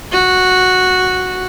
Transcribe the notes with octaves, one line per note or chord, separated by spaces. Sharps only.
F#4